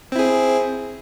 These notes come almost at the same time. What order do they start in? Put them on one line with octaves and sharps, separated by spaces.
C4 E4 G#4